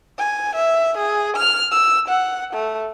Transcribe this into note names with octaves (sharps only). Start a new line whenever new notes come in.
G#5
E5
G#4
F6
E6
F#5
A3